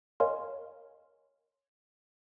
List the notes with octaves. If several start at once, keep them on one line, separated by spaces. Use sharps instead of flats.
A#4 C#5 D#5 F5 G#5 C6